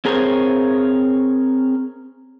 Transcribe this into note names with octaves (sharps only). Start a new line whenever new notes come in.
C4 G#4 A#4 C5 C#5